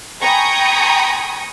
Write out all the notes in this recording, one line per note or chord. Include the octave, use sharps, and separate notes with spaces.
G5 G#5 A#5 B5 C#6 D#6